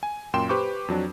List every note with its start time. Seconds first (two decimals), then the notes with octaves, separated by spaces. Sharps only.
0.03 G#5
0.33 F#2 A#2 G5 C6 E7
0.49 G4 B4 C5 C#6 D6
0.88 F2 F#3 D4